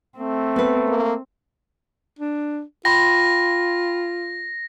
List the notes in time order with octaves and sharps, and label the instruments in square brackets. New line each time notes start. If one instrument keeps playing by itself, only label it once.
[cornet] A3 [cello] C4
[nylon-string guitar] B3 B4
[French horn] A#3
[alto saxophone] D4
[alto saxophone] F4 [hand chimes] G5 B5 C6 [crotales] A#6